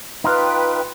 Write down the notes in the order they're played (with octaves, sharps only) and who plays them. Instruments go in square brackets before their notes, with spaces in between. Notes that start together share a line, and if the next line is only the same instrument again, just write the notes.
[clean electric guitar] D#4 F4 [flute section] B4 G5